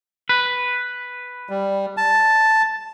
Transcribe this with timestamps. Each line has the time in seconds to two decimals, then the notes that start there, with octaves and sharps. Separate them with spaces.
0.29 B4
1.50 G3
1.97 A5